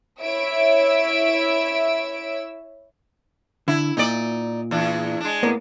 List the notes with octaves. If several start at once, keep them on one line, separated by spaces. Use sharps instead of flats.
E4 C#5 E5 E6 D7
D3 E4
A#2 D#4 D5
E2 D4
G#3 D4
A2 A#3 B3